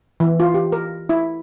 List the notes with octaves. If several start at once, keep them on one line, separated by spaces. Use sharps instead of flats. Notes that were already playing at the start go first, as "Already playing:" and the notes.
E3
F4
G4
A#4
E4